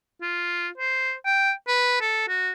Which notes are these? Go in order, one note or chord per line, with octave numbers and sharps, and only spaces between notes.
F4
C5
G5
B4
A4
F#4